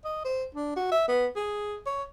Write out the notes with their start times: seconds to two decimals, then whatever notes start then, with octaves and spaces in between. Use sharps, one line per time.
0.05 D#5
0.25 C5
0.55 D4
0.76 F#4
0.92 E5
1.08 B3
1.36 G#4
1.86 C#5